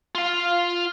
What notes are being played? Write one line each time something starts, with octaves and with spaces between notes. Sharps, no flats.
F4 F5